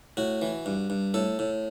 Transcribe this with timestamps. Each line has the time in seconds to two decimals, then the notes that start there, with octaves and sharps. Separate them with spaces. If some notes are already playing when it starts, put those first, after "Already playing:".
0.17 A2 F#4
0.42 E3
0.66 G2
0.90 G2
1.14 A2 A4
1.39 A2